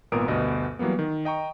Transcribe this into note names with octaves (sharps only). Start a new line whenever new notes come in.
G#1 A#2 B3 A#4 D#6 D7
D2 G2 B2 D#5
E3 F#3 G3 A#3 B3
D#3
D#5 G5 A#5 C#6